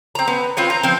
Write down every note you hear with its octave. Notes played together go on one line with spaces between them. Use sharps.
C4 A#5
B3
C4 F4 B4 C#5
A#5
F3 C4